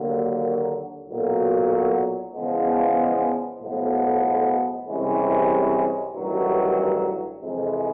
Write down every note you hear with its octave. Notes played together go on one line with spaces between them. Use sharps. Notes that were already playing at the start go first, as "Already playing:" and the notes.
Already playing: D#2 D3 F#3 A#3
B1 A#2 F#3
E2 C#3 F3 G#3 B3
B1 A2 F3 G#3 B3
C2 C3 E3 G#3 C#4
A1 G2 D#3 F#3
F2 C3 E3 G#3